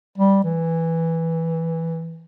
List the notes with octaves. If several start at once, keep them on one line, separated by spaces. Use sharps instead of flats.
G3
E3